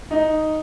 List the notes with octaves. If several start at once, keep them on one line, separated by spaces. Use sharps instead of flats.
D#4